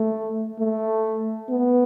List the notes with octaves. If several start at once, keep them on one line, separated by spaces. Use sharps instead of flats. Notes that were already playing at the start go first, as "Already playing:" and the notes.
Already playing: A3
A3
B3